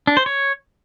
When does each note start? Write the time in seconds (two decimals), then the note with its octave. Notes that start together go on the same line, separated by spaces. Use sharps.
0.07 D4
0.17 C5
0.26 C#5